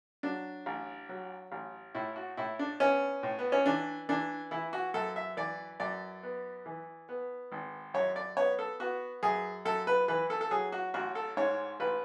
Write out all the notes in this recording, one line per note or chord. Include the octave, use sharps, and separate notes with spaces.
F#3 D4
A1
F#3
A1
A2 E4
F#4
A2 E4
D4
B3 C#4
A2
B3
C#4
E3 D4
E3 D4
E3 E4
F#4
F#2 A4
E5
E3 D5
F#2 D5
B3
E3
B3
G#1
F#2 C#5
D5
B3 C#5
A4
B3 F#4
F#2 G#4
F#2 A4
B4
E3 B4
A4
A4
F#3 G#4
F#4
A1 F#4
A4
G#2 C#5
A1 B4